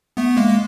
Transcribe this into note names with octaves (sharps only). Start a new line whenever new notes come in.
A3 B3
G#3 A#3
G#3